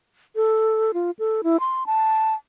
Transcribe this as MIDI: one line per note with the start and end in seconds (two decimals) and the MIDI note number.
0.36 0.92 69
0.94 1.11 65
1.19 1.41 69
1.44 1.60 64
1.60 1.86 84
1.86 2.34 81